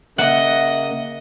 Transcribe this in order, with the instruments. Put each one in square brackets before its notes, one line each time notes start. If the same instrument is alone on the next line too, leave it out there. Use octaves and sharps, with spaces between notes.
[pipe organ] C#3 A#3 [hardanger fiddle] D#5 [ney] E5 [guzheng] F#5